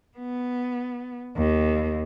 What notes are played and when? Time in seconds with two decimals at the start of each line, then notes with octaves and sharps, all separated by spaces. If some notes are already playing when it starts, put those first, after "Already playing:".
0.18 B3
1.37 D#2